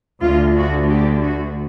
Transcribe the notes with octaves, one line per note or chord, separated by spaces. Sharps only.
D2 D3 F4
F#4
G4
F#4